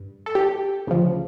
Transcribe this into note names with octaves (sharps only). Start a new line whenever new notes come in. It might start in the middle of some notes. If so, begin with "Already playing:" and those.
Already playing: G2
A4
G4
D2 C#3 F3